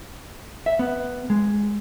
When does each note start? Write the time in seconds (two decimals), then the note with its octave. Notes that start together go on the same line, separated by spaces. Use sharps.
0.66 E5
0.79 B3
1.30 G#3